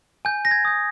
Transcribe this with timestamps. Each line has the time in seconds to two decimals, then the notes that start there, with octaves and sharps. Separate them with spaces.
0.25 G#5 G6
0.45 A#6
0.51 G#6
0.65 D#6 G6